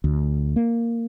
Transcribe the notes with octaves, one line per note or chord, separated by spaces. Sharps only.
D2
A#3